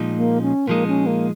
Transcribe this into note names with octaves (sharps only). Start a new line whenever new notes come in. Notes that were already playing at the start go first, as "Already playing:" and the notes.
Already playing: A#2 F3 G#3 D#4
A#3
C#4
A#2 F3 G#3 A#3 D#4
C#4
A#3